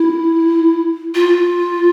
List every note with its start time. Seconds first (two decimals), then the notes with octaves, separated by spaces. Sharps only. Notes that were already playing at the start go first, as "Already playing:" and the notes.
Already playing: E4
1.14 F4